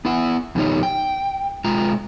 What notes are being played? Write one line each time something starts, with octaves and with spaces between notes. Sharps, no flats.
B3 E4 F#5
F2 B2 D#3 G3 D#4 C#5
G5
B2 G#3 F4 A#5